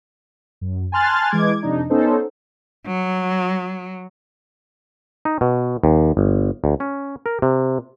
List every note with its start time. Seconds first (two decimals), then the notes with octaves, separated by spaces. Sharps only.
0.61 F#2
0.92 G#5 A5 C6 F6 F#6 A6
1.30 E3 G#3 D6 G#6
1.62 F2 C3 D4 D#4
1.90 B3 C#4 D#4 A4 C5
2.87 F#3
5.25 D#4
5.41 B2
5.84 D#2
6.17 G1
6.64 D2
6.80 C#4
7.26 A#4
7.42 C3